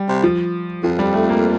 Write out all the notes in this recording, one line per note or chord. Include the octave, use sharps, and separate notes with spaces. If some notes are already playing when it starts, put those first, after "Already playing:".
Already playing: G3
C3
F3
F2 F3
G3
A3
A#3